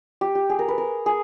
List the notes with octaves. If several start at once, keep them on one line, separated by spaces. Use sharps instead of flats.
G4
G4
G#4
A#4
B4
A#4
G#4